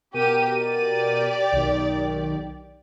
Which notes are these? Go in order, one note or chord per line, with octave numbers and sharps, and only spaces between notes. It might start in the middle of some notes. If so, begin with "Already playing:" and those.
B2 G4 A#4 D#7
G4 D5
B1 D#3